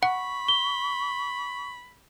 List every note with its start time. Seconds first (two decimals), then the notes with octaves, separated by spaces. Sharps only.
0.03 F#5 B5 C#6
0.48 G7